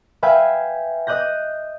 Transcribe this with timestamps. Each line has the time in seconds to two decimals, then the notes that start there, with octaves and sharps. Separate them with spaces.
0.23 B4 E5 F5 G5 G#5
1.07 D#5 D#6 F#6 G6 A#6